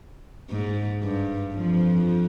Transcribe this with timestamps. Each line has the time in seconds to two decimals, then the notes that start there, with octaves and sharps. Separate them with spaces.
0.50 G#2
1.03 G2
1.54 F2 F3